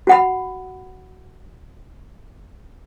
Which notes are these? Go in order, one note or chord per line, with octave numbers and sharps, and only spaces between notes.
F#4 F#5 B5